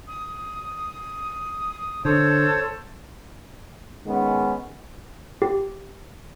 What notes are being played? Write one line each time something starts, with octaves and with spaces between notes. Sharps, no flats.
D#6
D3 A4 C5 C#5
D#3 G#3 B3 C#4
G4